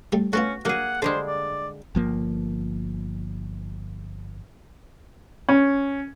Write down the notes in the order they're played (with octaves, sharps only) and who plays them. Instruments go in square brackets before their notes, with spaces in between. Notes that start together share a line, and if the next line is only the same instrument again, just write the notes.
[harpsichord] C3 G3 A3
[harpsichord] A3 B3 F4 [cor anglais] C#4 [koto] F#4
[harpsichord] D3 F#3 [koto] A#3 G#4 [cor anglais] F#5
[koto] D3 G3 G#3 [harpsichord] A4 [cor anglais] C5
[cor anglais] D5
[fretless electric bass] G1 F3 A#3
[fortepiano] C#4